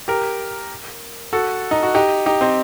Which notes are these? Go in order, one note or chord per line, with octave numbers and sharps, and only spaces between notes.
G4 A#4
F#4 A4
D#4
F#4
D#4 G4
D#4 G4
C4 D#4